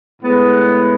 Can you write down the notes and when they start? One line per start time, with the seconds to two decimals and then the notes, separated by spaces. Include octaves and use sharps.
0.22 A2 G#3 B3